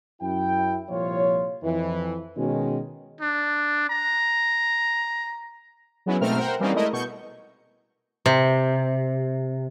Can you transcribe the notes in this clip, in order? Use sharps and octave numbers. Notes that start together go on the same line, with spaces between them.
F#2 E4 G5
C2 A#2 F3 F4 C#5
F2 E3
B2 D#3 G#3 C#4
D4
A#5
F#3 G#3 B3 C#4 E4
G#2 B2 A3 C4 A#4 F6
A#4 C5 F#5 G5
E3 G3 A#3 C4 C#4 D#4
G#3 A3 E4 A#4 D#5
B2 C#6 G6
C3